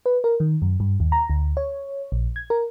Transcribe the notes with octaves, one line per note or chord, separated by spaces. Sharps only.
B4
A#4
D#3
F#2
G2
D#2
A#5
D2
C#5
A#1
G#6
A#4